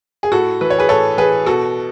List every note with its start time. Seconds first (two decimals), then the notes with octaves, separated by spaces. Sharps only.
0.23 G#4
0.32 A2 F#4 A4
0.61 E3 B4
0.70 C#5
0.78 G#4 B4
0.89 A2 A4 C#5
1.18 E3 G#4 B4
1.46 B2 F#4 A4